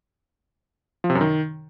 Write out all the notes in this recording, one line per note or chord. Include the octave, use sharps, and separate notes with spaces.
F3
C3
F#2
D#3